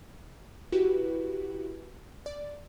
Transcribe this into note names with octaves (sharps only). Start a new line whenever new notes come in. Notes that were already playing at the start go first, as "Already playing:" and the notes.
E4 F#4 G4 B4
D5